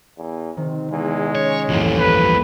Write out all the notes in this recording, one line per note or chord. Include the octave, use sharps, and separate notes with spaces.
E2
C3 D#3 C4
E2 G#3
C#4 C#5
C2 F2 A2 E3 A#3
B4